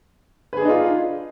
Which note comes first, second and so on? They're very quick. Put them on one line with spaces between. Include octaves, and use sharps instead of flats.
B4 G#4 D4 D#4 F4